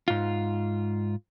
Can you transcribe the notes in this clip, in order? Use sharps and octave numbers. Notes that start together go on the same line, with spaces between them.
G#2 F4